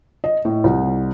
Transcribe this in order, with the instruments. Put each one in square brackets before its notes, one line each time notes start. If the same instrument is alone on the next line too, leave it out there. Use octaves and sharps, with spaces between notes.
[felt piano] D#5
A2
C2